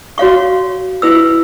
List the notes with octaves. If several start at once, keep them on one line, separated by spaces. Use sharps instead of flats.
F#4 C#5 F5 C#6
E4 B4 E6